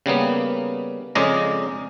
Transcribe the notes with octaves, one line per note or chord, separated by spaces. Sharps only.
C#3 G3 A#3 B3
F2 C#3 G#3 D5 D#5 A#5